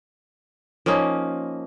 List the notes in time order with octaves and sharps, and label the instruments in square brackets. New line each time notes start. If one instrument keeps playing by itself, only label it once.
[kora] F3 A#3 C#4 D#4